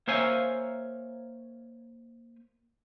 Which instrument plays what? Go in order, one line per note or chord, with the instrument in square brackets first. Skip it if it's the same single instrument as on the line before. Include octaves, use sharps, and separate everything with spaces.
[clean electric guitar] A#3 C5 C#5 E5 F5 G#5